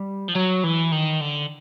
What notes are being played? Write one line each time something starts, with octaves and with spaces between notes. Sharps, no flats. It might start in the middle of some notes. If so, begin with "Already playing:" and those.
Already playing: G3
F3
F#3
E3
D#3
D3